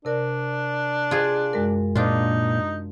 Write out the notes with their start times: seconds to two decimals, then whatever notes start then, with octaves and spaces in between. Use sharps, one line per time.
0.05 C3 D4 A#4 D5
1.11 F4 G#4
1.53 F#2 G#3 A#4
1.95 A#2 A#3 D4 D#4 F4